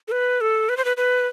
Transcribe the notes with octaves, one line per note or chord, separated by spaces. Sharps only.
A4
B4
A4
B4
C5
B4
B4